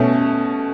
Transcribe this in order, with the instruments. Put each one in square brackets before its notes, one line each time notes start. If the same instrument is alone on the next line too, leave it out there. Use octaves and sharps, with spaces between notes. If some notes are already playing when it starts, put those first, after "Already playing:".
Already playing: [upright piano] B2 A3 C#4